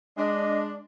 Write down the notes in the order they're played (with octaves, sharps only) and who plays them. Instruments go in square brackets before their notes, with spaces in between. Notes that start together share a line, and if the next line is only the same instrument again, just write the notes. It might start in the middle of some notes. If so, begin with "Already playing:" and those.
[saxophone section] G#3 D4 [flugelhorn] D#5